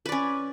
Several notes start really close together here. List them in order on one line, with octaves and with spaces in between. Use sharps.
B4 D5 C#4